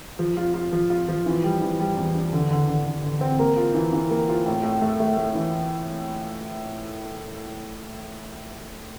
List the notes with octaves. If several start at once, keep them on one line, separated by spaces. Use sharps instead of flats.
F3
F4
F4
F3
F4
F3
E3
G3
E3
G3
E2
D4
D3
D3
D3
D3
D3
C4
A#3
F4
E3
E3
A#3
F4
A2
A2
A3
A3
A3
E3